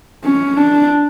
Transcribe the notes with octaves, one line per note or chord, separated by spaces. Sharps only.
C#4
D4